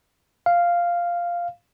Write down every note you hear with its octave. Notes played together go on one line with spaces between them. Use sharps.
F5